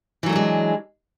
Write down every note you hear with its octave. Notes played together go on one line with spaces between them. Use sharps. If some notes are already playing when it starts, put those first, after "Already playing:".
E3 F#3 G#3 A3 D4